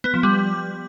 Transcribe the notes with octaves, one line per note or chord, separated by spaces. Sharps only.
B3
F3
G3